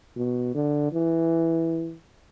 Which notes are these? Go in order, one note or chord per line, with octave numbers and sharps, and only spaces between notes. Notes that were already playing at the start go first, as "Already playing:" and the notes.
B2
D3
E3